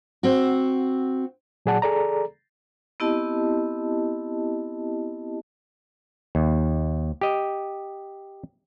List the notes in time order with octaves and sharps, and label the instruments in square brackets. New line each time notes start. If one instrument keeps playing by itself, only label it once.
[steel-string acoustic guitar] C4 F#4
[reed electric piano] A#2 F#3 G#4 D5 F#5 A5
G#4 A4 D5 A#5
[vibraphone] B3 C4 E4 G4 D#5 A5
[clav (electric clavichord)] D#2
G4 D#5